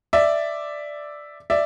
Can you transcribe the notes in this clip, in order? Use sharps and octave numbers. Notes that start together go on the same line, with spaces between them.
D5 E5
D5 E5